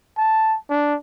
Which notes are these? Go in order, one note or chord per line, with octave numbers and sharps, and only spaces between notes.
A5
D4